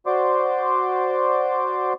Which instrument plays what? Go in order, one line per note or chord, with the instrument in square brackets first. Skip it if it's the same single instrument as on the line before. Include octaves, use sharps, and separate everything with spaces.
[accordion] F#4 C5 D5 C6 D6